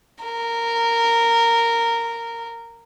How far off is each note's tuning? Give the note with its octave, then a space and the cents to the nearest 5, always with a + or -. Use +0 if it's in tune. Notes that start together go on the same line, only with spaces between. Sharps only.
A#4 -10